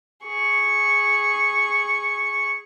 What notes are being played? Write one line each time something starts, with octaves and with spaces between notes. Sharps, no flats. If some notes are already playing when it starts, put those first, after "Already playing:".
G#4 C#6